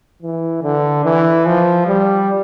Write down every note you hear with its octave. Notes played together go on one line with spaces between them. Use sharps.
E3
D3
E3
F3
G3